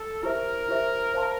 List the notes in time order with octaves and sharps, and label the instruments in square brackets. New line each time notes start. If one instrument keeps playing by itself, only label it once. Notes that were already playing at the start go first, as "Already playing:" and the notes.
Already playing: [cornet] A4
[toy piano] E4 G4 C5 E5 [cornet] A#4
[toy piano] E4 G4 C5 E5
C5 F5 A5 C6